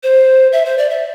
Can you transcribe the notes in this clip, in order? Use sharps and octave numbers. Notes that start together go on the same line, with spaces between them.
C5
E5
C5
D5
E5